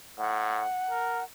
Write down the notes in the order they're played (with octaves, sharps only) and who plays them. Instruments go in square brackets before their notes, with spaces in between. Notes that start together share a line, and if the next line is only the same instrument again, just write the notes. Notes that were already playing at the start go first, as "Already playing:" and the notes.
[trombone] A2 [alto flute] F#5
[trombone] A#4